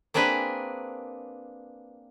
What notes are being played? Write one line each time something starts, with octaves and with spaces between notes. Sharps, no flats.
A#3 C4 D4 G#4 B4